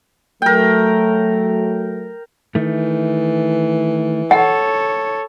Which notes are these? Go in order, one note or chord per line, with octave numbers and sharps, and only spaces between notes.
F#3 A3 A#4 G5
D#3 E3 A3
A4 C#5 F#5